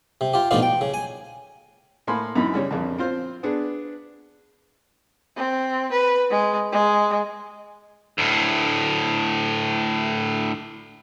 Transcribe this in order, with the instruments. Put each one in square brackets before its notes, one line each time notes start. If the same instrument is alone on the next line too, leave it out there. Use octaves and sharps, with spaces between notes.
[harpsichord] C3
F4 G4
A1 B2 F3 D4 D#4 F4
G5
C#3
G#5
[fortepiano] A2 A#3 G#5 B5 C6
F#2 E3 D#4 B5
C#3 G3 C#5
A#1 F2
C4 F4 C5
B3 D4 G#4
[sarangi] C4
B4
G#3
G#3
[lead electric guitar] D2 A2